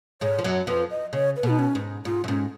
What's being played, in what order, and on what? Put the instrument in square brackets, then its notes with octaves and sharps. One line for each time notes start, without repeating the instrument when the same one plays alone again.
[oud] G#2 G#3 [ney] C#5
[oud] F3
F#2 F#3
[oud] F2 F3 [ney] B4
[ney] D#5
[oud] C#3 [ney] C#5
[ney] B4
[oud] B2 [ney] D#4
[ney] C#4
[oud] G#2
[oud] G#2 [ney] F4
[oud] F#2
[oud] G#2 [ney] C#4